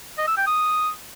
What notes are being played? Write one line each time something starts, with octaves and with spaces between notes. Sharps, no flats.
D#5
E6
G5
D#6